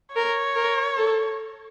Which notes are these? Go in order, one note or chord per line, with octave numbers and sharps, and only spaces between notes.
A#4 C#5
A#4
A4